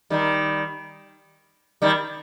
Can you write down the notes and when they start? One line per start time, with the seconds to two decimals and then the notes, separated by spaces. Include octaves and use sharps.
0.10 D#3 G3
1.82 D#3 G3